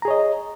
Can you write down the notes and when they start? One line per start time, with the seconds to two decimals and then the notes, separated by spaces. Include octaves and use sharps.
0.02 A#5
0.05 G#4
0.08 C#5
0.11 D#5